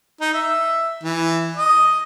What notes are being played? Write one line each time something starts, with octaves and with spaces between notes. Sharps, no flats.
D#4
E5
E3
D#5